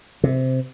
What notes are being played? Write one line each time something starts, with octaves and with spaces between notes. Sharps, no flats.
C3